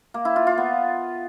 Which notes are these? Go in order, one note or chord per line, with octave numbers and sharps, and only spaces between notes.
A#3
E4
F4
F4
B3